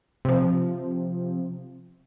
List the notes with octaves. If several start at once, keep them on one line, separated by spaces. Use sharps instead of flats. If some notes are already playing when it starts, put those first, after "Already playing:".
C3 F3